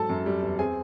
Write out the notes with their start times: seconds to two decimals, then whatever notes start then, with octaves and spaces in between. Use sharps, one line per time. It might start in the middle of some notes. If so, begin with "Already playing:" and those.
Already playing: G#2 F#3 A4 A5
0.10 F#2
0.26 G3
0.42 E2
0.59 C4 G#4 G#5